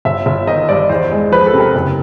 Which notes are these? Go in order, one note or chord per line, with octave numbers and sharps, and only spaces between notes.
G1 E5
G1
D#3 D#5
G2 D5
E2 C5
G#3
F3 B4
A4
C3
A#4
F#1